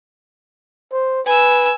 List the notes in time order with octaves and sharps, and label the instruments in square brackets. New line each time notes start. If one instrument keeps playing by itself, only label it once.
[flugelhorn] C5
[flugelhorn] B4 [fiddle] G#5 E6